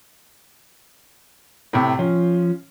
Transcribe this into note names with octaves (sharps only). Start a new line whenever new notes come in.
A2 C3
F3 C#4